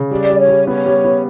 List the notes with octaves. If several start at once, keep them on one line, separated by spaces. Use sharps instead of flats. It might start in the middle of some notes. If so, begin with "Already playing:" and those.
Already playing: C#3
G3 D5
G3
C#5
G3
B3 C#5
G3
B3